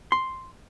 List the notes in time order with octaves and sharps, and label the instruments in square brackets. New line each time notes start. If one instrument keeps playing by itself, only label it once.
[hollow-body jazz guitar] C6